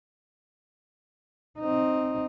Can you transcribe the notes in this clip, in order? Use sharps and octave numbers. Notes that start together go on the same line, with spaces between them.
C4 D#4